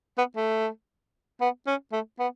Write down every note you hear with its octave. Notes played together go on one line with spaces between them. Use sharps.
B3
A3
B3
C#4
A3
B3